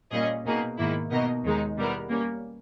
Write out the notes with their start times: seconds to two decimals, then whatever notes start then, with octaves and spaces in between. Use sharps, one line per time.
0.12 A#2 G3 C#4 G#4 D#5
0.45 B2 A#3 D#4 G#4
0.78 G#2 D#3 A#3 E4
1.11 B2 A#3 D#4 A#4 D#5
1.44 D#2 D#3 G#3 D#4
1.76 B2 G3 B3 E4 A#4
2.09 G3 A#3 C#4